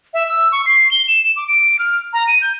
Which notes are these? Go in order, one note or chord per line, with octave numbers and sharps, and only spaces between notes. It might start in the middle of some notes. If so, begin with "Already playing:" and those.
E5
E6
C#6
C7
G7
E7
D6
D7
F6
A#5
D#7
G6